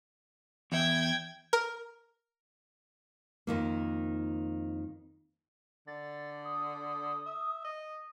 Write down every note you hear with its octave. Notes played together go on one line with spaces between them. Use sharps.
E2 E5 G5 G#6
A#4
F2 D#3 A#3
D3 A6
D#6
E5
D#5